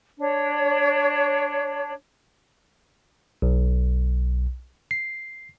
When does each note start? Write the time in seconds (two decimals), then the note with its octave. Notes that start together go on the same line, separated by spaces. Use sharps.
0.19 D4 C#5
3.42 B1
4.91 C7